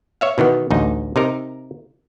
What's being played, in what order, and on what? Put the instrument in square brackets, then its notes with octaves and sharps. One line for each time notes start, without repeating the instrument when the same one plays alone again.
[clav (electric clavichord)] C#5 E5 F5
B2 D#3 E3 B3
A1 D2 D#4
C3 D#4 A#4